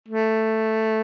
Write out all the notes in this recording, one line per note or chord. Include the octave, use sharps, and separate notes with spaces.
A3